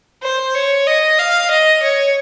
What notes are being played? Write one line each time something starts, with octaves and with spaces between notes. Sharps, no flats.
C5
C#5
D#5
F5
D#5
C#5